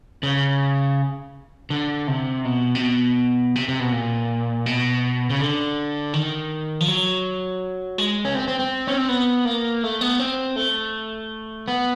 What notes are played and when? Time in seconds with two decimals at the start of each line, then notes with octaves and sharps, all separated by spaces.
0.23 C#3
1.70 D3
2.08 C3
2.45 B2
2.75 C3
2.81 B2
3.56 C3
3.68 C3
3.80 B2
3.92 A#2
4.66 B2
5.30 C#3
5.39 D3
6.13 D#3
6.81 F3
6.88 F#3
7.98 G#3
8.25 C#4
8.35 C4
8.48 C4
8.59 C4
8.87 C#4
8.98 C4
9.09 B3
9.45 A#3
9.83 A3
10.01 B3
10.20 C4
10.56 A3
11.68 B3